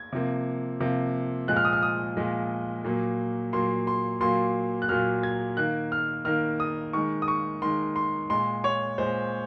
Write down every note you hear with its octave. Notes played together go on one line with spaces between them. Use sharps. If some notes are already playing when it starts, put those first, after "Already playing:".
Already playing: G#6
C3 F3 A#3
C3 F3 A#3
A#2 F3 G#3 F#6
F6
D#6
F6
D#6
A#2 F3 G#3
A#2 F#3 A#3
A#2 F#3 A#3 C6
C6
A#2 F#3 A#3 C6
F#6
A#2 F#3 A#3 F6
G#6
D#3 A#3 F#6
F6
D#3 A#3 F6
D#6
D#3 G#3 C#6
D#6
C#6
D#3 G#3 C6
C6
A#2 G#3 C6
C#5
A#2 G#3 C5